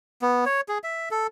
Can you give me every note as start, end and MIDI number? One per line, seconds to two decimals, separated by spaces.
0.22 0.45 59
0.46 0.61 73
0.68 0.78 68
0.84 1.09 76
1.11 1.27 69